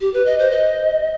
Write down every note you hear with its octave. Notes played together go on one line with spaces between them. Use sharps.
G4
B4
D#5
C5
D#5